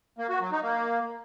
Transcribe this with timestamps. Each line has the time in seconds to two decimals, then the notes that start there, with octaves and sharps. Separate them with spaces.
0.18 A#3
0.29 F#4
0.41 F#3
0.52 D#4
0.63 A#3